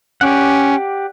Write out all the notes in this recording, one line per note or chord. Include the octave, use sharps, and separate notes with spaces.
C#4 G4 D5 F#5